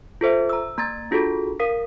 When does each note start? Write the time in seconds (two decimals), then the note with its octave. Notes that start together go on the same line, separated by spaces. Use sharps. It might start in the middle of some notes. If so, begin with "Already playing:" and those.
0.21 F4 A4 C5 E5
0.50 A#5 E6
0.78 A#3 A#5 G#6 A6
1.11 D4 F4 F#4 G#4 A4
1.60 A#4 F5 D#6 B6